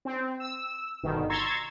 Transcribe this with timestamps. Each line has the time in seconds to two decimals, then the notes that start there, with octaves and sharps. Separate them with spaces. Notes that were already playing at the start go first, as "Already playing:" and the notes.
0.05 C4
0.40 E6
1.03 G1 B2 D#3
1.30 A#5 C6 C#6 E6 G#6 A6